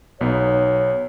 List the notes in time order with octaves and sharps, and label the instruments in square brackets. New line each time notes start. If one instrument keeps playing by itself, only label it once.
[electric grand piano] B1 B3 D#4 [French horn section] C#5